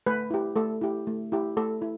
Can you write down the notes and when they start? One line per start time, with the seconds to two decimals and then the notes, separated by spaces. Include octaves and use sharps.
0.06 A3 B4
0.30 E4 G4
0.56 A3 A4
0.81 E4 G4
1.07 A3
1.32 E4 G4
1.57 A3 A4
1.82 E4